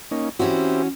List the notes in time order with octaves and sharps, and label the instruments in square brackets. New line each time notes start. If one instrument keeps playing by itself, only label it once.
[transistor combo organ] A#3 C#4 D#4
[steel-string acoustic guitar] E3 C#4 F#4 [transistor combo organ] C4 E4 G4